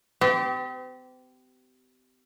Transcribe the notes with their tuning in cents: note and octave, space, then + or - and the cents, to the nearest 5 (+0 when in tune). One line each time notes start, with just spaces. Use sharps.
C4 -45 G4 -25